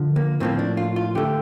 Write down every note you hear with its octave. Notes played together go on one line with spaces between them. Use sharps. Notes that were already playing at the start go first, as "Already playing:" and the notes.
Already playing: D3 F3
A#3
A2 F3 A#3 C4
D4
F4
F4
D3 A3 G4